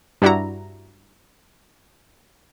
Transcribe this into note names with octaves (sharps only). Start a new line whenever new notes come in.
G2 G3 D4 E4 F#4 A#5